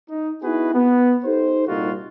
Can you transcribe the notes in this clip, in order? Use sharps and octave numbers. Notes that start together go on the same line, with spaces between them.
D#4
B3 D#4 E4 F#4 G#4 B4
B3
D#4 G4 A4 C5
C2 A#2 G3 D#4 F4 F#4